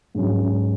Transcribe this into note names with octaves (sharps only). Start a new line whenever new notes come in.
G#2 F#3 C#4